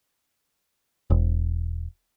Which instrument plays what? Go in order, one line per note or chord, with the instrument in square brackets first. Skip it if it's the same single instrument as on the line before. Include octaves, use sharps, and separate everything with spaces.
[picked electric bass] E1